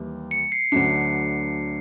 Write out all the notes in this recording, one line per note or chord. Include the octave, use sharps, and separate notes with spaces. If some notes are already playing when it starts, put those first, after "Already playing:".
Already playing: D#2 E3 G3
C#7
C7
D2 D3 F#3 A3 D4 C7